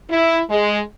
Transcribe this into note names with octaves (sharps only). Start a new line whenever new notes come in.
E4
G#3